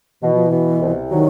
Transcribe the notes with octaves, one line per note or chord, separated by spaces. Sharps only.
B2 E3
F3
E3
B2
C2
D#3 F#3